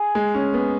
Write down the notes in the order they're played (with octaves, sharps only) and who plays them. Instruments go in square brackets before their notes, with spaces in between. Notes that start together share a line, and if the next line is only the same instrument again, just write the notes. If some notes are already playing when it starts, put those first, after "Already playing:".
Already playing: [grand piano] G#4
[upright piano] G#3
C#4
B3